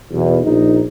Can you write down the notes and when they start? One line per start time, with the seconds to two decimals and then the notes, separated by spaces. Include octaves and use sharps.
0.12 B1 E2
0.45 A#1 D#4